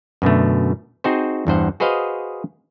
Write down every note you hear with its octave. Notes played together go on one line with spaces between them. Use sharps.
F#2 B2 D3 A3
C4 D#4 F#4 G#4 C5
E2 G2 C5 F#5
F#4 G#4 B4 C5 D#5 F5